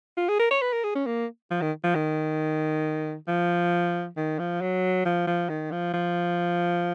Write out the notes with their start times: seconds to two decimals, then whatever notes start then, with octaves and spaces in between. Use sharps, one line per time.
0.17 F4
0.29 G#4
0.40 A#4
0.51 C#5
0.62 B4
0.72 A#4
0.84 G#4
0.95 C#4
1.06 A#3
1.51 F3
1.62 D#3
1.84 F3
1.95 D#3
3.28 F3
4.17 D#3
4.39 F3
4.61 F#3
5.05 F3
5.27 F3
5.49 D#3
5.72 F3
5.94 F3